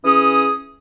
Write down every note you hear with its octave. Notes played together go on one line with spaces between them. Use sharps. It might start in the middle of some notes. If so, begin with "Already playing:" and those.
E3 C#4 G#4 D#6